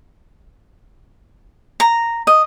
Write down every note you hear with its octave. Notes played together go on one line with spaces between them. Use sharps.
A#5
D#5